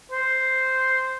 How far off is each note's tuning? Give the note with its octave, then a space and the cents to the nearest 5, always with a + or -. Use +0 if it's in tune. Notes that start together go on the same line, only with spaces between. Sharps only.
C5 -5